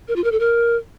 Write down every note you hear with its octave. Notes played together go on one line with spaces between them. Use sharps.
A#4
F4
A#4
A4
A#4